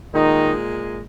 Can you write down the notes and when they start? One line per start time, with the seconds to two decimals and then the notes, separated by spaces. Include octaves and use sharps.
0.14 A#2 D#3 G#3 D#4